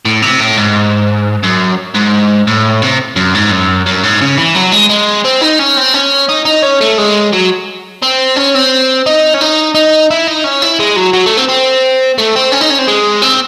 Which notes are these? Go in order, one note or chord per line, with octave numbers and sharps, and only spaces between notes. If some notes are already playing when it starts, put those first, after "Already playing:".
A2
C3
A2
G#2
F#2
G#2
A2
C3
F#2
G#2
F#2
F#2
G#2
C#3
E3
F#3
G#3
G#3
C4
D#4
C#4
C4
C#4
D#4
D#4
C#4
A3
G#3
F#3
C4
C#4
C4
D#4
C#4
D#4
D#4
E4
D#4
C#4
E4
G#3
F#3
F#3
A3
C4
C4
A3
C4
C#4
D#4
C#4
C4
G#3
C4